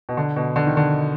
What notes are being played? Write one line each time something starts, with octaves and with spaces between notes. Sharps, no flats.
B2
D3
B2
D3
D#3
D3